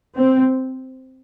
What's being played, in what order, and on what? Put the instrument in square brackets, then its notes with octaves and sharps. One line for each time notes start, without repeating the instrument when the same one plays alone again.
[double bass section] C4